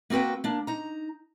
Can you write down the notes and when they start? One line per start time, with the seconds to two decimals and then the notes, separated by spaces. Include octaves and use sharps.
0.10 A#3 C4 F#4 B4 G5
0.44 A#3 D4
0.67 D#4 A#5